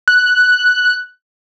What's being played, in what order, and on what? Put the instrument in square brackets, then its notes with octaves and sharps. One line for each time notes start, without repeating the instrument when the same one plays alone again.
[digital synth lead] F#6